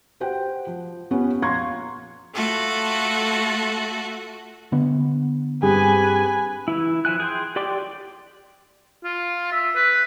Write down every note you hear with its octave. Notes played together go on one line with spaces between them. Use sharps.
F#4 G4 C5 F#5 G5
F3
B3 C#4 F4 G4 C#5
A#1 F5 A#5 C6 C#6 G#6
A3 F4 F#4 A4
D3 B3
G2 C4 G4 G#4 B4 G#5
E3 E4
F3 E4 G#5 F#6
G#4 G5 C6
G4 D5 G5 C6 D6
F4
E5
B4